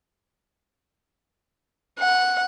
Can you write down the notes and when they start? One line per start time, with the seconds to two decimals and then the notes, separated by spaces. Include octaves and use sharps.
1.99 F#5